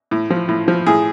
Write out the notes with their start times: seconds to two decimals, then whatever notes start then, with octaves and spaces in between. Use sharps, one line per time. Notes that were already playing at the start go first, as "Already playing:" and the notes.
0.11 A2
0.30 F3
0.49 A2
0.68 F3
0.86 A2 G#4